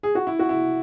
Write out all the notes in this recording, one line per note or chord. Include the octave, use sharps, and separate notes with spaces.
G#4
F#4
E4
F#4
E4